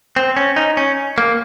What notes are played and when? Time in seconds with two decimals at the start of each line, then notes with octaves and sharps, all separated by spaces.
0.16 C4
0.37 C#4
0.56 D#4
0.77 C#4
1.18 A#3